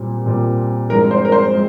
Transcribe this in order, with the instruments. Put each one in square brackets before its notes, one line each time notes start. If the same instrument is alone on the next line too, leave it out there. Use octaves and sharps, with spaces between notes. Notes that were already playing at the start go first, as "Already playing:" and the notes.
Already playing: [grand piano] A#2 G3 C4
A#2 G3 C4
[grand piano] G2 F3 G#3 C4 F4 [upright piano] A#4
[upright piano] C5
A#4
C5
[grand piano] G#3 C4